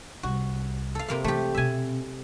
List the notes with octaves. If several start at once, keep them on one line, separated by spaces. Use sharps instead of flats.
C2 F#4
A4 F5
C3 A#3 F5
E3 A3 G4
B2 C4 E5 G#5